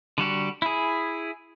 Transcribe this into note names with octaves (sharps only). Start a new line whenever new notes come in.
D3 G3 F#4 G4
E4 G#4